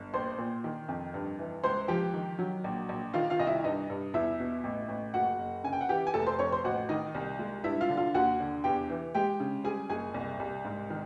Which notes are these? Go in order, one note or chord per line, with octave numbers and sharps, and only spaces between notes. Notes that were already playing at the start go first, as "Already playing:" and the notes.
Already playing: G1
A#1 C5 C6
A#2
D#3
F2
G2
E3
C#2 C5 C6
F3 G4 G5
D#3
F#3
A#1
A#1
D#3 F4 F5
F4 F5
C2 D#5
E4 E5
G2 D#4 D#5
G2
E2 E4 E5
B2
A1
A1
F#1 F#4 F#5
F#1
C#3 G#5
G5
F#5
E3 G4 G5
G#5
F1 A4 A5
C5 C6
F2 C#5 C#6
C5 C6
A1 F#4 F#5
D#3 D#4 D#5
C2
G#3
G2 E4 E5
F4 F5
D3
F4 F5
D#2 F#4 F#5
D3
E2 G4 G5
E3
G#3 G4 G5
C#3
G3 G#4 G#5
F#1 G#4 G#5
C2
C2
G#2
D#3